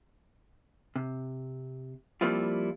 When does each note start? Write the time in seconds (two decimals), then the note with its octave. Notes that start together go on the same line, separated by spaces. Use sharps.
0.96 C3
2.21 F3 G3 A#3 C4 E4 F4